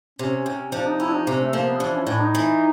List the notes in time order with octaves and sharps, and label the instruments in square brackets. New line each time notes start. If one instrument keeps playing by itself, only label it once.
[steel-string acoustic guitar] C3 [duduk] C#4
[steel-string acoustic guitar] C3
[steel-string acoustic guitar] F3 [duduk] D4
[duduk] D#4
[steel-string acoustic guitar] C#4 [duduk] E4
[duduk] D4
D#4
[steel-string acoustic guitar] C3 [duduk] D4
[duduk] A3
[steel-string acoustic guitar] F3 [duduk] A#3
[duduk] B3
[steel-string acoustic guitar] E3 [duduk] D4
[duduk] C#4
[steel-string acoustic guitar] A2 [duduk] D4
[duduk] D#4
[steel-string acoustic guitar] E3